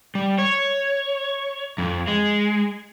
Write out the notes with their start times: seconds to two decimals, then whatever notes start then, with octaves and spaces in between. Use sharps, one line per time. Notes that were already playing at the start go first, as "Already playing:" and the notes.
0.15 G3
0.38 C#5
1.78 F2
2.08 G#3